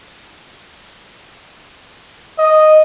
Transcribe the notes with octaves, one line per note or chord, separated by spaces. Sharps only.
D#5